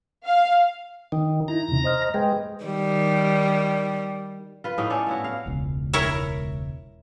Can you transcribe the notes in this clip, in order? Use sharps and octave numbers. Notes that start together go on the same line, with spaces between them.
F5
D#3
D#4 E4 A#5
E2 C3
C5 D#5 F6
G#3 B4 D#5 G5
D#3 G3
F4 B4
A2 A#3 D#4
C#4 A4 D5
B3 E4 F#4
F5
E1 C#2
E4 A#4 C#5